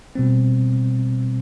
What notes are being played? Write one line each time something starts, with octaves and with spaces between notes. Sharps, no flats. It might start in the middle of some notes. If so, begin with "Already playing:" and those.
B2 G3 C4